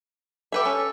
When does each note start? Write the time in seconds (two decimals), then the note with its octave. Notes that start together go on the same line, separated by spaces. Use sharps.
0.52 G4 A4 B4 E5
0.65 C#4